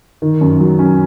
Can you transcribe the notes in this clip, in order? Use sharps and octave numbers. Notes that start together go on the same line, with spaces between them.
D#3
F#2
F#3
C#4